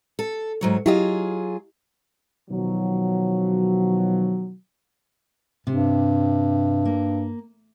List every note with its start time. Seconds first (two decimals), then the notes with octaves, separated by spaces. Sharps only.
0.19 A4
0.61 G#2 F#3 C#5
0.86 F#3 E4 F4 G4 G#4 D#5
2.50 B2 D#3 F3 F#3
5.67 G2 C3
6.85 A#3